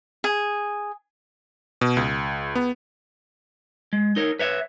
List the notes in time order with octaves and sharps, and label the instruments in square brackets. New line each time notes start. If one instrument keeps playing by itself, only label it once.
[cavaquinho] G#4
[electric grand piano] B2
C#2
B3
[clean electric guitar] G#3
D#4 A#4 C#5
B4 C#5 E5